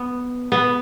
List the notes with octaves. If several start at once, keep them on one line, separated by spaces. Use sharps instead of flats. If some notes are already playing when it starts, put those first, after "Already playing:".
Already playing: B3
B3